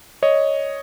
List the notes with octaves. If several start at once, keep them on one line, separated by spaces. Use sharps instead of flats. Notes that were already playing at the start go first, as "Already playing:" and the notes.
C#5 D#5